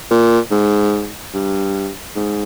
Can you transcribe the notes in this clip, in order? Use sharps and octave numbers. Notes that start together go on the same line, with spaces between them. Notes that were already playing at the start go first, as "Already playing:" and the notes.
A#2
G#2
G2
G#2